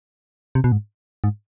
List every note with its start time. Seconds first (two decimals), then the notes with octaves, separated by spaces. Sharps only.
0.55 C3
0.64 B2
0.72 G#2
1.24 G#2